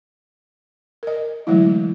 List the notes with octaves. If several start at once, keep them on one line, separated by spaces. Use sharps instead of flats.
A#4 D#5
D3 E3 F#3 G#3 A3 E4